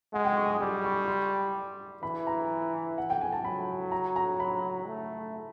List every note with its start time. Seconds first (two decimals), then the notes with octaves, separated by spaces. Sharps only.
0.13 G#3 F#5
0.25 G5
0.36 C#6
0.48 D#6
0.60 G3 D6
0.84 C#6
1.08 C6
2.03 E3 B5
2.27 A#5
2.98 F#5
3.10 G5
3.21 G#5
3.32 A5
3.45 F#3 B5
3.92 A#5
4.16 A#5
4.40 B5
4.87 A3